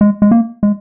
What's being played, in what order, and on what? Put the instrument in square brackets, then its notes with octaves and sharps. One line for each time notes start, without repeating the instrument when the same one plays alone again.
[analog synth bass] G#3
G#3
A#3
G#3